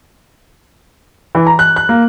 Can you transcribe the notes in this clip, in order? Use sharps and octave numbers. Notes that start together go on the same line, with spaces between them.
E3
A#5
F#6
F#6
A#3